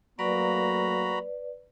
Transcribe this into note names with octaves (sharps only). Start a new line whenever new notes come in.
F#3 A3 A#3 F#4 B4 D5 A#5 B5